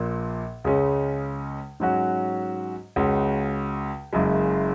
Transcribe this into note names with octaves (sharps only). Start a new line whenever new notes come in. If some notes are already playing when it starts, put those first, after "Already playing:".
Already playing: A#1 A#2 A#3
C#2 C#3 G#3 C#4
G#2 F#3 C#4 F#4
C#2 C#3 G#3 C#4 F#4
F#1 F#2 C#3 G#3